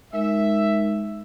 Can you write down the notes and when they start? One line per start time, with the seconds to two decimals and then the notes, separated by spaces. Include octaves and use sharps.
0.13 G#3 D#4 A#4 E5